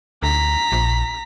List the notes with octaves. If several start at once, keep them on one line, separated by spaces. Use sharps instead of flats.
D2 A#5 B6
A#1